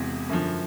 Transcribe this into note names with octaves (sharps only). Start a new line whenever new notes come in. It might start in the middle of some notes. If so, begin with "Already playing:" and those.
Already playing: E1 E2 C3
F#2 D3 F3